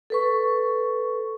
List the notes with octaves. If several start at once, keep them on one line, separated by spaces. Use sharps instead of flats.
A4 B4 C#6